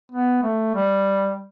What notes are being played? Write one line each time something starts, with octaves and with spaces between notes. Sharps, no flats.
B3
A3
G3